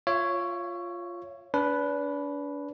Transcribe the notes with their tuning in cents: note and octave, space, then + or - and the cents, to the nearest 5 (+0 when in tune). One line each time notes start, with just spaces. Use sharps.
F4 +0 C#5 +0 E5 +35
D4 -35 B4 +0